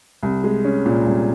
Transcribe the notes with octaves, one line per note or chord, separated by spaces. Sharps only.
C2
G#3
C#4
A#2
C2